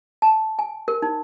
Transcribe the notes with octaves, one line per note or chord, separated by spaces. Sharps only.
A5
G#5
A#4
D#4